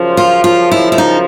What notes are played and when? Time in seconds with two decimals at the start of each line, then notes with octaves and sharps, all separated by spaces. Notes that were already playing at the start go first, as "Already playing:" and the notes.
Already playing: F#2 C#3 F3
0.17 F4
0.44 F4
0.71 E4
0.92 E4
0.98 D#4